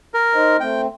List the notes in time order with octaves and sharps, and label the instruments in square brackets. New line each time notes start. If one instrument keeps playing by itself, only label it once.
[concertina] A#4
[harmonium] D#4 C5 D#5
[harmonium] A3 C4 [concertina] G5